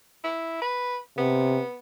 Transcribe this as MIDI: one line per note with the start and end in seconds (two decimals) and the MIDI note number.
0.24 0.60 64
0.61 0.98 71
1.18 1.60 48
1.18 1.78 59